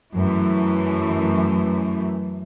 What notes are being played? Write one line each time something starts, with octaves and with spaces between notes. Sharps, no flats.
F#2 E3 A3